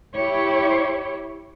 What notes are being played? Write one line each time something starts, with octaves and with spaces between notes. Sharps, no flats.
E4 G4 C#5